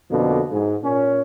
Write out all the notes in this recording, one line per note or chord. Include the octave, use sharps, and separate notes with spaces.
F2 B2 D3 A#3
G#2
A#2 C#4